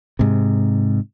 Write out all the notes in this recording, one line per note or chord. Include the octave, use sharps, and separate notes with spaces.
G#2 C3